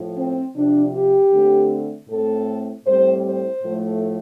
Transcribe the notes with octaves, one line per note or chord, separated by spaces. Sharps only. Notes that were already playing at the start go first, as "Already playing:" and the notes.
Already playing: A2 F3
C4
C3 F3 C4 D4
G4
D3 A3 C4
A2 A3 C4 A4
A2 G3 C4 C5
C5
A2 F3 A3